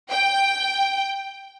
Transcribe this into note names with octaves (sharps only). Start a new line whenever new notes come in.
G5